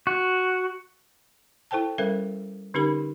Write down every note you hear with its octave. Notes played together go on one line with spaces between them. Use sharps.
F#4
E4 A4 C5 G5 A5
G3 C#4 A4 A#4 C5 E5
D3 C#4 D#4 G4 A#4 B5